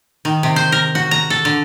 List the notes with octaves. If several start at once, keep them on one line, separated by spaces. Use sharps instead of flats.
D#3
C3
C5
A#4
F#4
A#5
A4
D3